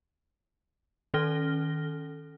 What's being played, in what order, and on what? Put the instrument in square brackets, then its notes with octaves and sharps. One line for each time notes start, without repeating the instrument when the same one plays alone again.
[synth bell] D#3 C#4 A4 F6 A#6 G7